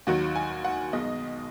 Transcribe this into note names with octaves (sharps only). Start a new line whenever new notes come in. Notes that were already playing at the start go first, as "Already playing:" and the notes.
D#2 D#3 F#3 F#4
G#5
F#5
B1 B2 G#3 D#5